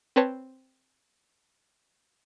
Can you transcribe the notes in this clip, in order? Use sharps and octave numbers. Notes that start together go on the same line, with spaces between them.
C4 B4 C#5 A5